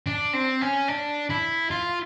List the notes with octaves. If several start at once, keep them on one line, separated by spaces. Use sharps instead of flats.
D4
C4
C#4
D4
E4
F4